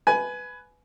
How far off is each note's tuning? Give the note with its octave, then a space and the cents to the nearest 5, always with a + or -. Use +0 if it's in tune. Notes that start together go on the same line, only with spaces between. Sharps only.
B4 +5 G#5 +20